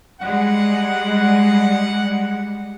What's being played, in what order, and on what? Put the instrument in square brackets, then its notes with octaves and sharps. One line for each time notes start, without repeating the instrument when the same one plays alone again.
[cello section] G3 G#3 [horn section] F#5